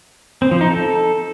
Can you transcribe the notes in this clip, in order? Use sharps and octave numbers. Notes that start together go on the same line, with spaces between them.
C4
F3
D#4
A4